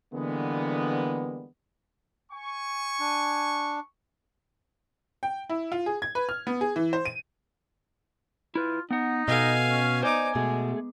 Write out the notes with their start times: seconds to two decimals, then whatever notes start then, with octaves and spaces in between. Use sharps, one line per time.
0.14 D3 E3 G3 G#3 A#3 B3
2.32 G#5 C#6
3.00 D4
5.23 G5
5.49 E4
5.72 F4
5.86 G#4
6.02 G#6
6.15 B4
6.29 F6
6.47 B3
6.61 G#4
6.76 E3
6.93 C5
7.05 D#7
8.55 E4 F4 B4
8.91 B3 D#4 F#5
9.28 B2 A4 D#5 F5 G#5
9.70 C#4
10.03 D#4 C5 D5 D#5 G#5 D6
10.35 B2 G#3 A3 G#4